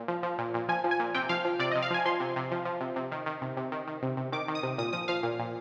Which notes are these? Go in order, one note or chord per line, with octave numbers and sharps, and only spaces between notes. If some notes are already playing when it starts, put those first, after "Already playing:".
Already playing: A#2
F3
F3
A#2
A#2
F3 G#5
F3
G#5
A#2
C3 G5
F3 F5
F3
C3 D5
D#5
C3
F5
F3 G#5
F3 C6
C3
C3
F3
F3
C3
C3
D#3
D#3
C3
C3
D#3
D#3
C3
C3
D#3 D6
D#3
D#6
C3
A#2 D#6
F3 D#6
F3 F5
A#2
A#2